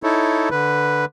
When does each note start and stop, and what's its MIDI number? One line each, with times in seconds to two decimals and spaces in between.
0.03 0.49 63
0.03 0.49 64
0.03 0.49 69
0.03 0.49 73
0.51 1.05 50
0.51 1.05 71